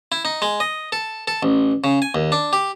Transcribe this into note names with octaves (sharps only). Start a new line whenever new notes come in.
E4
D#4
G#3
D#5
A4
A4
A1
C#3
G#5
D#2
D4
G4